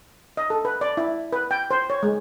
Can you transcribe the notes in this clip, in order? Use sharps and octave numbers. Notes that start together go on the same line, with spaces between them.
D#5
A4
B4
D5
E4
B4
G5
C5
C#5
G#3